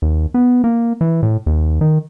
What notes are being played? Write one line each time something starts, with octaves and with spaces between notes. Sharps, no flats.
D#2
B3
A#3
E3
A2
D#2
D#3